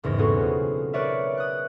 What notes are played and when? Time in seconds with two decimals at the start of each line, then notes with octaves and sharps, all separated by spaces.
0.04 F#1 E2 G#2 A#6
0.18 B2 B3 C4 F#4 G#4 A4
0.41 F4
0.93 A#4 B4 C#5 D5 E5
1.37 D#6 F#6